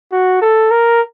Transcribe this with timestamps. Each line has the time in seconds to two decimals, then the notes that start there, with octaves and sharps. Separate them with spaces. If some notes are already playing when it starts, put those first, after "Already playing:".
0.12 F#4
0.42 A4
0.71 A#4